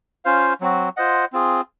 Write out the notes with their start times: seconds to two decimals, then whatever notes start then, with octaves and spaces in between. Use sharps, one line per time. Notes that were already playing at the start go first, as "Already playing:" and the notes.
0.25 C#4 F4 C5 F5
0.61 F#3 C4 F#4
0.97 F4 C5 D#5 F#5
1.33 C4 F4 G#4